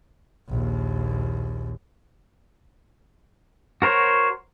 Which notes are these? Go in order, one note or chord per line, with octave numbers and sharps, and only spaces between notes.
A#1 D#2
F#4 A#4 C5 C#5